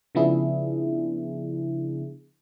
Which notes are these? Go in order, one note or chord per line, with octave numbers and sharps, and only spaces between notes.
C#3 F3 B3 D4 E4 G#4